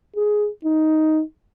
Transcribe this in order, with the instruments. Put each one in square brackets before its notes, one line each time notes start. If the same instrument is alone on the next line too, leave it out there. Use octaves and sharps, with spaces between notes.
[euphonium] G#4
D#4